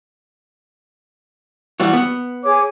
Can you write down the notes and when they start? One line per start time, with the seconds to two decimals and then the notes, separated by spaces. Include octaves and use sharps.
1.80 E3 G3 F#4
1.93 B3
2.44 G#4 C#5 D6